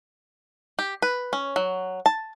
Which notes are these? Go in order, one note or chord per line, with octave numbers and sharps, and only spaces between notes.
G4
B4
C#4
F#3
A5